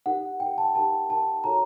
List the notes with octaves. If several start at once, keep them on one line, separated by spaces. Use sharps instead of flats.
D#4 G4 A#4 F#5
D#4 G4 A#4 G5
A5
D#4 G4 A#4 A5
D#4 G4 A#4 A5
D#4 F#4 A4 C#5 A#5